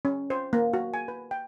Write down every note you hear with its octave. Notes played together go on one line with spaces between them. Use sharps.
C#4
C5
A#3
F#4
G#5
B4
G5